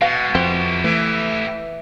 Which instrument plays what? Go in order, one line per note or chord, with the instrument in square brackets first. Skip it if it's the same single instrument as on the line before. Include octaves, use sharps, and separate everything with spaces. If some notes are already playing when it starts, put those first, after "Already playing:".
[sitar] B2 [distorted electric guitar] G#3 B3 [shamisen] F5
[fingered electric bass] F2 [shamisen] C4 [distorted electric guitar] E4 G4
[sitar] E3 [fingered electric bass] A3